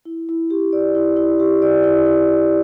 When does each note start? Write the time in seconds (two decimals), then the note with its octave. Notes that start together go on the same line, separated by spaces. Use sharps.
0.05 E4
0.29 E4
0.50 G4
0.73 D5
0.95 E4
1.17 E4
1.40 G4
1.62 D5
1.84 E4
2.06 E4